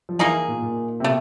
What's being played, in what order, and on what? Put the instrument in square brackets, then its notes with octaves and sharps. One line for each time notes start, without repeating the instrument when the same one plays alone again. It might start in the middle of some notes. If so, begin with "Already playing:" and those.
[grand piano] F3
[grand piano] E3 [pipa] A#3 D#4 G#4
[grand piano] A#2
A#2
C3
[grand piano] B2 [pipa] A3